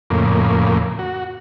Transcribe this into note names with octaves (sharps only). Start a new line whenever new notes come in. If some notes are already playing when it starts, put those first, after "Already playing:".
F2 A2 C#3 A#3
F#4